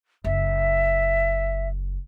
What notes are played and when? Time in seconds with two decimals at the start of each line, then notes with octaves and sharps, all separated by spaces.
0.24 F#1 E5